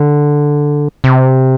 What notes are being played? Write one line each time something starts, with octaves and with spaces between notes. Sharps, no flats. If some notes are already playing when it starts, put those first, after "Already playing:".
Already playing: D3
C3